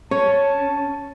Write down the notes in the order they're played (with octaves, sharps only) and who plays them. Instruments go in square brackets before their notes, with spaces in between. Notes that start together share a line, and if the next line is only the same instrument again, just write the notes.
[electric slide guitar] C#4 [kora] C#5 [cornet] A5